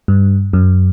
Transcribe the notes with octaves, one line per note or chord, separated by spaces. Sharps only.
G2
F#2